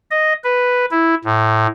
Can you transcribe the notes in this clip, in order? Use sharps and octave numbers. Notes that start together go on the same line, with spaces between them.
D#5
B4
E4
A2